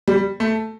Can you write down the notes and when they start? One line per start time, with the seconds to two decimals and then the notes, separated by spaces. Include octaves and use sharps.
0.08 G3
0.40 A3